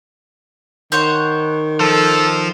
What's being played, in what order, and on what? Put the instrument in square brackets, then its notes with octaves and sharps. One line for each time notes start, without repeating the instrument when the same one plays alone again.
[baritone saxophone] D#3 [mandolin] C5 C#5 F#5
[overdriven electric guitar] F3 [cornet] A4